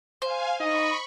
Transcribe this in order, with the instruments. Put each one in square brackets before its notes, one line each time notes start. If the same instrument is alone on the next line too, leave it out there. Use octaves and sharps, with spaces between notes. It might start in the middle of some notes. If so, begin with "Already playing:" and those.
[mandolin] C5 [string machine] F5 G#5
[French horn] D#4 [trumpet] D#5 [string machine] B5 C#6